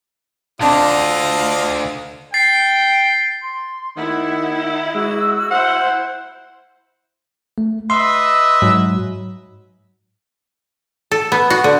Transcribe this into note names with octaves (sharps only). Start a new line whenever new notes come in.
D2 D3 C4 D4 F4 D#5 A5
G5 A6 C7
C6
D#3 E4 F#5
G#3 F#4 E6
E4 C5 F#5
A3
B4 D#5 E5 C6
G#2 F#3
A4
B3
F#4
D3